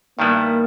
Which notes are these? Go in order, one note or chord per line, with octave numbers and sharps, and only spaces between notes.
G2 D#3 G3 A#3 B3 E4